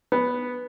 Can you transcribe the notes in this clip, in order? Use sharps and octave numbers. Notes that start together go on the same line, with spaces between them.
B3